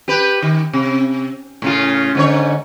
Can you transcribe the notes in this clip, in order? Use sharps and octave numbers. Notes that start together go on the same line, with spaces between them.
G4 B4
D#3
C3
A2 C#3 F4
G#2 D3 C#5